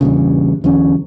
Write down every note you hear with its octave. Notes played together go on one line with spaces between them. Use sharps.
E2 G2 A#2 C#3
E2 D3 F#3 C#4